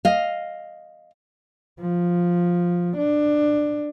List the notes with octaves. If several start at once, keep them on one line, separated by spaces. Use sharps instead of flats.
D#5 F5
F3
D4